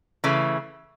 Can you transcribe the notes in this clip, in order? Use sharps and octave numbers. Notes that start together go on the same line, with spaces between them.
C#3 E3 A3